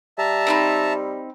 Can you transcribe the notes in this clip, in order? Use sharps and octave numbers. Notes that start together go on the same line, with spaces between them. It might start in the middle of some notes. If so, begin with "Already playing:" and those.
G3 E5 A5 A#5
C4 D#4 B5